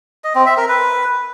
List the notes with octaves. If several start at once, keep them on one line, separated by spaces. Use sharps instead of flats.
D#5
C4
E5
A#4
B4